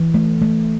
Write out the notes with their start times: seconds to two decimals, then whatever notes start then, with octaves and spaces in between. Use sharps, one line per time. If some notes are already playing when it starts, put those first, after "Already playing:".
Already playing: E3
0.14 A3
0.42 A3